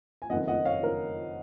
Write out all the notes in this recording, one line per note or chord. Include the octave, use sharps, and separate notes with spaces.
G#5
F#1 F2 D#3 D#5 F#5
D#5 F#5
C#5 F5
D#3 A#4